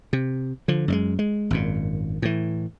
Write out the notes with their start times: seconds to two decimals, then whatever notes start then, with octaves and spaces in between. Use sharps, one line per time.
0.13 C3
0.68 D3 F3
0.88 F#2 G3 G#3
1.19 G#3
1.50 G#1 F#2 A#2
2.22 A2 E3